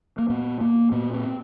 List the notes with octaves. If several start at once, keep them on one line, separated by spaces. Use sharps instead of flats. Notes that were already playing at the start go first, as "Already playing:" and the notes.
A#3
A#2 B3
A#3
A#2 B3
C4